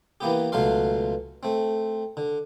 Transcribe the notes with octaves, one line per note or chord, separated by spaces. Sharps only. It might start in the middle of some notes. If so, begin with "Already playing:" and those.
E3 A#3 B3 G4
C#2 B2 F#3 A3 F5 C6
A3 C4
D3